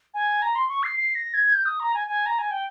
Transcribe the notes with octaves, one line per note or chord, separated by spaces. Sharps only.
G#5
A#5
C6
C#6
C7
C7
A#6
G#6
G6
D#6
A#5
G#5
G#5
A#5
G#5
G5